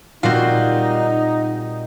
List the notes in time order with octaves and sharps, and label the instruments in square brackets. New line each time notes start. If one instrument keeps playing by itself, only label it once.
[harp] A#2 G3 C4 [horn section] D#4 [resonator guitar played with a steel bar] F4 F#4